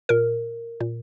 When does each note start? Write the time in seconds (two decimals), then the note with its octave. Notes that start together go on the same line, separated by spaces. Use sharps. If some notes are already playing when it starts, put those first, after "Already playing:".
0.09 A#2 A#4
0.80 A#2